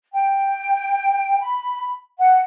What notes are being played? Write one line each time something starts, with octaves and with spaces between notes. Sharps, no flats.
G5
B5
F#5